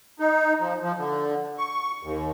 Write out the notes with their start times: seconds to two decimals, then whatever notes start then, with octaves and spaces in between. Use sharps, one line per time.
0.20 D#4
0.60 F3
0.82 F3
0.98 D3
1.58 C#6
2.03 D#2